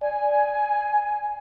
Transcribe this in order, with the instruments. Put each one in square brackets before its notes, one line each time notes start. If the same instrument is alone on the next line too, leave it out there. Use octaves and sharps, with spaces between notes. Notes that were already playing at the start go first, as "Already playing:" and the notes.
[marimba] D5 [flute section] G#5